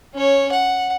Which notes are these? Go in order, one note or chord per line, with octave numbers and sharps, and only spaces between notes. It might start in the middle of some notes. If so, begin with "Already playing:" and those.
C#4 C#5
F#5